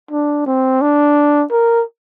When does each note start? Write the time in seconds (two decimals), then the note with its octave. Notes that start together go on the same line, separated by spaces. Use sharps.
0.11 D4
0.46 C4
0.81 D4
1.51 A#4